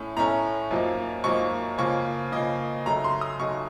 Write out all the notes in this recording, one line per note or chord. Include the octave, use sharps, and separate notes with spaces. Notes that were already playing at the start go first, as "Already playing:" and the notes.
Already playing: A2 A3 C#4
A2 A3 C#4 A#5
F#2 F3 A#3 D#4
F#2 F3 A#3 D#4 C#6
C#3 F3 A#3 C#6
C#3 F3 A#3 D#5
C#3 F#3 A3 D#4 A#5
C6
D#6
C#3 F#3 A3 D#4 C#6